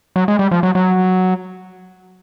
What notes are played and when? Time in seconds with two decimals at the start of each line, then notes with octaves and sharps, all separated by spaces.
0.16 F#3
0.28 G#3
0.39 G3
0.51 F3
0.63 F#3
0.75 F#3